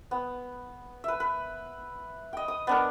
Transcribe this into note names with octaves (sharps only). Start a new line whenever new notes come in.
B3
B4 E5
B4
D#5 G5
D#6
B3 D4 A#4